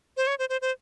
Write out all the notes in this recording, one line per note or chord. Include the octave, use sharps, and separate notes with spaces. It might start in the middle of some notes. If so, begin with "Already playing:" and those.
C5
C#5
C5
C5
C5